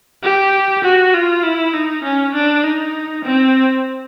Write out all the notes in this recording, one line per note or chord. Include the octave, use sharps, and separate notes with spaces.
G4
F#4
F4
E4
D#4
C#4
D4
D#4
C4